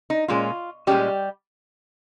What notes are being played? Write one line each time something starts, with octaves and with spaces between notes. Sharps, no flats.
D#4
A#2 G#3 C#4 F4
A#2 G3 G#3 C#4 G4